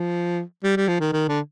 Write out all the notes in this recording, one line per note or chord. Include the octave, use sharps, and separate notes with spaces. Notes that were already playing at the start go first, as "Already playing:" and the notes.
Already playing: F3
G3
G3
F3
D#3
D#3
D3